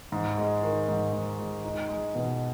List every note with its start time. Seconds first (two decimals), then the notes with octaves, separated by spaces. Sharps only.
0.12 G#2
0.38 G#3
0.63 D#3
0.88 G#2
1.13 G#2
1.39 G#3
1.64 D#4
1.89 G#3
2.15 B2